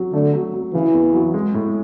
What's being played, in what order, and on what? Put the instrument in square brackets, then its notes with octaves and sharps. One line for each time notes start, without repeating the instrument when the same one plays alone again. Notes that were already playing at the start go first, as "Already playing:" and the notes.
Already playing: [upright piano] F#3
[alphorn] D3 [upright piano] A3
[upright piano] F#3
F#3
[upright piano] C#3 [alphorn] E3
[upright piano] E2
F#3
G#3
A2